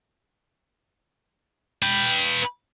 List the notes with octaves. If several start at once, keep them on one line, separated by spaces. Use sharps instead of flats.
B4 G5